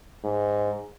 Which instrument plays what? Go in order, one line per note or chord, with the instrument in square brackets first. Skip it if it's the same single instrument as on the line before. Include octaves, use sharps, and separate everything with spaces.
[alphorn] G#2